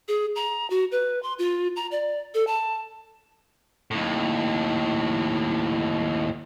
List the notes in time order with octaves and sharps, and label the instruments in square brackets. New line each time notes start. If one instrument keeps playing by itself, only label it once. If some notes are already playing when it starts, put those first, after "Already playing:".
[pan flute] G#4
A#5
F#4
B4
C6
F4
A#5
D5
A4
A5
[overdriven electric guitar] D#2 A2